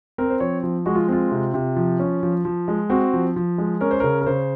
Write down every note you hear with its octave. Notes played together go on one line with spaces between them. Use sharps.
C4 A#4
C5
F3 C#5
F3
G#3 F#4
F4
C4 F4
C3
C3
F3
C#4
F3
F3
G#3
C4 F#4
F3
F3
G#3
C#4 A#4
C5
C#3 A#4
A#4
C#3 C5